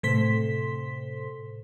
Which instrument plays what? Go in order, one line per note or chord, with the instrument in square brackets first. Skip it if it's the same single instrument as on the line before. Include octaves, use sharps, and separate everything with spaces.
[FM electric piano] A2 C3 A4 C5 C6 B6